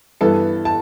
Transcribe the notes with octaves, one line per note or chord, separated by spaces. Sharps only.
G2 E3 B3 A4 A5
A5